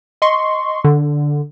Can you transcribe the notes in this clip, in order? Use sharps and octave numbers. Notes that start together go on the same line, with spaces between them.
D#5 C6 C#6
D3